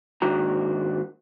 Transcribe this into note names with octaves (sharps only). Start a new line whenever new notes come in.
D#2 G#2 D#3 D4 F#4 A#5